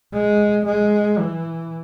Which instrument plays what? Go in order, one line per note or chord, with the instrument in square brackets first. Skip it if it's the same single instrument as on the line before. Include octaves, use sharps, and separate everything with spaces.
[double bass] G#3
G#3
E3